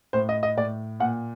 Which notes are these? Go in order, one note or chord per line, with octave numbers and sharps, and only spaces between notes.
A2 C5
D#5
D#5
A2 D5
A#2 F#5